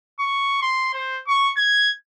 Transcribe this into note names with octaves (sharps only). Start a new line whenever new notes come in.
C#6
C6
C5
C#6
G#6